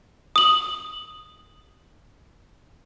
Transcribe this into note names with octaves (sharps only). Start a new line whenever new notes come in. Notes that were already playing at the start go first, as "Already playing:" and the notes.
D#6 F#7